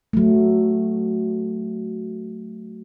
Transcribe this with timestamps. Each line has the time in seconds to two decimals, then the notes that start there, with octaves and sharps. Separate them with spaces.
0.13 F#3 A3